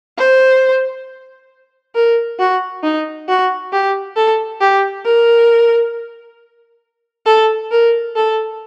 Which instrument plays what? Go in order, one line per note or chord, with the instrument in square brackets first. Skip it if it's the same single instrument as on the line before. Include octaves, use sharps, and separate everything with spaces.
[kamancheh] C5
A#4
F#4
D#4
F#4
G4
A4
G4
A#4
A4
A#4
A4